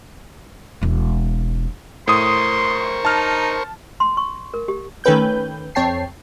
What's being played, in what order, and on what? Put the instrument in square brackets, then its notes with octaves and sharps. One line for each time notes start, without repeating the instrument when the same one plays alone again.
[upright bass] E1 C4
[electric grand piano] A2 D#6 [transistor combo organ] A#4 C5 C#6 [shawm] C6
[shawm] D#4 [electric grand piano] A5 F6
[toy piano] C6
C#6
A#4
G4
[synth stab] D#3 A3 C#4 B4 G5 G6
F2 C4 C#5 G5 A5 C7